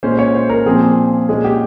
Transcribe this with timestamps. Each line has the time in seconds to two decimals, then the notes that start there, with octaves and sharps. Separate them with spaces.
0.03 A#2 G#3 C#4 C5
0.19 C#5
0.35 C5
0.50 A#4
0.66 A#2 F3 C4 G#4
1.29 A#2 G#3 C#4 G#4
1.44 G4